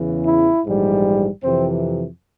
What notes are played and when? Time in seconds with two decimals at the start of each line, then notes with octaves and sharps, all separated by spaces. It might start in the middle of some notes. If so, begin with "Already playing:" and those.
Already playing: E2 C#3 E3
0.26 E4
0.65 A#1 G#2 E3 G3
1.43 F2 C3 E3 C4